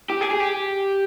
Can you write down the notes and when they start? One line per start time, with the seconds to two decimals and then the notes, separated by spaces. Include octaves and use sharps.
0.10 G4
0.21 G#4
0.31 G#4
0.40 G4